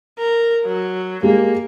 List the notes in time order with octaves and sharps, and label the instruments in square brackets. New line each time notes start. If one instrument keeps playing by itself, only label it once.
[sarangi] A#4
F#3
[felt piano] G#3 G4 [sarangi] A#3